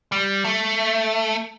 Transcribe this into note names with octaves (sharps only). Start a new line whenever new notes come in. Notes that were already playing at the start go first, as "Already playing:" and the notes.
G3
A3